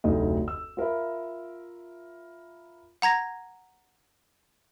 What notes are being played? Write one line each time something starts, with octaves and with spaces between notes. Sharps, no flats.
F1 D2 F#3 D#4 D#5
E6
F4 A#4 E5 B5
F#5 A#5 G#6 A#6